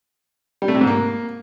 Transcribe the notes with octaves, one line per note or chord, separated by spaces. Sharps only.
G3
A3
C3
G#2
A#3